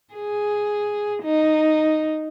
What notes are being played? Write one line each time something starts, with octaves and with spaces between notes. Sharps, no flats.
G#4
D#4